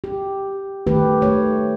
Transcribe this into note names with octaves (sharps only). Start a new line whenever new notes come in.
G4
D#3 A3 G4 B4
A3 C#5